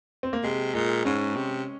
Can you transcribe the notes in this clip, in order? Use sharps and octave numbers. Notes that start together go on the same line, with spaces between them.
C4
A#3
C3 G#3
A#2 G#3
G#2 C#4
C3